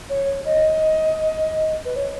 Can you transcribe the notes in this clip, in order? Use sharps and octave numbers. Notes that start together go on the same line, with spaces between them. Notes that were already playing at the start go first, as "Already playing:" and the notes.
C#5
D#5
B4
C#5